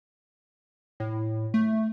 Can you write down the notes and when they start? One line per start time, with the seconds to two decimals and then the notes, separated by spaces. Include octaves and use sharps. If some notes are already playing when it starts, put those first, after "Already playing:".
1.00 A2
1.54 A3